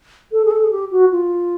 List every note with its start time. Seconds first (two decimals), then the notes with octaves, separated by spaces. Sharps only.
0.32 A4
0.45 G#4
0.51 A4
0.64 G#4
0.71 G4
0.91 F#4
1.12 F4